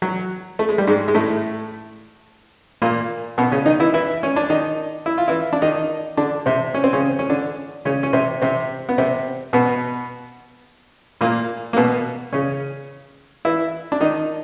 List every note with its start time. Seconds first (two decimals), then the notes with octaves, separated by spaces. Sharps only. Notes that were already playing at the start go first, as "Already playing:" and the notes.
0.02 F#3
0.59 A3
0.69 G#3
0.78 G3
0.87 G#2 G#3
1.08 G#3
1.15 A2 A3
2.82 A#2 A#3
3.38 B2 B3
3.52 C#3 C#4
3.66 D#3 D#4
3.80 E3 E4
3.94 E3 E4
4.23 C#4
4.36 D4
4.50 D#3 D#4
5.06 E4
5.18 F4
5.28 E3 E4
5.53 D4
5.62 D#3 D#4
6.17 D3 D4
6.46 C3 C4
6.74 C#4
6.84 C4
6.93 C#3 C#4
7.19 C#4
7.30 D3 D4
7.85 C#3 C#4
8.03 C#4
8.13 C3 C4
8.42 C3 C4
8.89 B3
8.98 C3 C4
9.53 B2 B3
11.21 A#2 A#3
11.73 A#3
11.77 B2 B3
12.33 C#3 C#4
13.45 E3 E4
13.92 D4
14.01 D#3 D#4